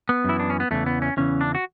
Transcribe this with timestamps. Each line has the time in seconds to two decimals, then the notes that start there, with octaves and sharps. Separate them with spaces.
0.09 B3
0.25 F#2 E3 E4
0.40 D4
0.50 C#4
0.60 B3
0.71 E2 C#3 E3 A3
0.86 B3
1.02 C#4
1.17 E2 C#3 E3 C#4
1.41 D4
1.55 F#4